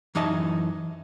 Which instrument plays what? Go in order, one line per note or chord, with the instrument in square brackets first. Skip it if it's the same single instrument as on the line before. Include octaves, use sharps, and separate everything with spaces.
[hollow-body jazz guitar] F#2 E3 D#4 D#5 A5